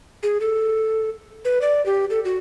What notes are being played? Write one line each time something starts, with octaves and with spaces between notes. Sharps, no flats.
G#4
A4
B4
D5
G4
A4
F#4